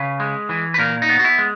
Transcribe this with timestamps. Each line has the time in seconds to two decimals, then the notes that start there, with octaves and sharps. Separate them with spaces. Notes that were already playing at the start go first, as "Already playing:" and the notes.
Already playing: C#3 B4
0.20 G#3
0.49 E3
0.74 B4
0.78 A#2 A#4
1.02 D#4
1.09 B3
1.19 F#4
1.24 E4
1.38 G#3